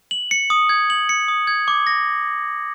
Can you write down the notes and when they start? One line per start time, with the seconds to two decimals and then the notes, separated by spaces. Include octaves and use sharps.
0.11 F#7
0.31 C#7
0.50 D#6
0.69 G#6
0.90 F#7
1.09 C#7
1.28 D#6
1.47 G#6
1.68 D6
1.87 A#6